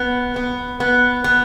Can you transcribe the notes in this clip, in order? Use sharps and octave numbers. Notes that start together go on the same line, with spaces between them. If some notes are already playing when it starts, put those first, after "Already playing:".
Already playing: B3
B3
B3
B3